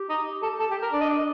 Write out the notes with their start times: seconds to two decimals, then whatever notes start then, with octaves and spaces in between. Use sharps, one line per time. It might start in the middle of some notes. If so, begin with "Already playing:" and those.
Already playing: G4
0.09 D#4
0.42 A4
0.59 A4
0.71 G4
0.82 A#4
0.92 D4 D5
1.01 D#5
1.09 D5
1.18 D#5